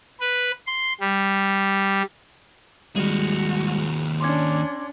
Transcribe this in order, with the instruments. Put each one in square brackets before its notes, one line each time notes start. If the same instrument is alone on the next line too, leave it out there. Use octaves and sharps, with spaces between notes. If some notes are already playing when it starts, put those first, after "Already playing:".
[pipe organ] B4
C6
G3
[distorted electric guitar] D#2 G#4 [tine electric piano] G3 G#3 [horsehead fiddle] F#4
[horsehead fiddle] C#4 D4 [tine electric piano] C6 D6 G#6